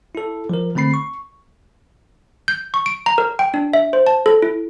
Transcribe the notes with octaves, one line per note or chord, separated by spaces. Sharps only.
E4 A4
F3 A#4
D3 A3 C4 B5 C7
C#6
G6
C#6
D7
A#5
A#4
G5
D4
E5
C5
A5
A4
E4